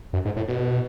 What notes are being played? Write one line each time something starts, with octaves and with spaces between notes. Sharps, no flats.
F#2
G#2
A2
B2